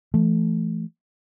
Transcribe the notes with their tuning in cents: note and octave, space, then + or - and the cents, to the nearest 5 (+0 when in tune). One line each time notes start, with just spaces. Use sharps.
E3 +40 A3 +0